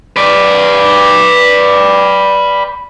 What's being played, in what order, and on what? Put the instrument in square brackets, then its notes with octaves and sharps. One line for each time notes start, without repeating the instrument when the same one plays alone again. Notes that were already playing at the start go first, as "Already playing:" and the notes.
[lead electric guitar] B4 D5